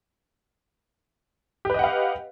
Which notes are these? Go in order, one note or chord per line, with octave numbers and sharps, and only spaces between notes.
G4 B4 D#5 F5 F#5